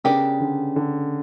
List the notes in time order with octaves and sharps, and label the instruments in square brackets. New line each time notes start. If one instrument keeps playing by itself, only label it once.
[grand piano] C#3 [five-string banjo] B3 D4 G4 A#4 D5
[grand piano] D3
D3